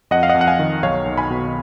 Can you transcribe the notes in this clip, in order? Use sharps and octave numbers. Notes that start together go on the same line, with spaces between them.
F2 D#5 F#5
F5
D#5 F#5
F2
F#5
F5 G#5
D#3
B1 C#5 F5
B1
G#5 B5
B2